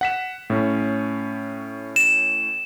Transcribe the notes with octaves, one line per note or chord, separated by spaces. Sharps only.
F#5 B6 E7
A2 C#4
E7